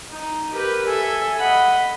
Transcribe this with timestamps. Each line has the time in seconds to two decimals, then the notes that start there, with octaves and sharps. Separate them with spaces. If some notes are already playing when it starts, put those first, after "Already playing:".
0.11 D#4
0.53 G4 A#4 B4
0.87 A4 E5 G#5
1.40 D#5 F#5 B5